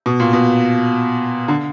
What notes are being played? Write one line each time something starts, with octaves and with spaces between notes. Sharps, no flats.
B2
A#2
B2
D3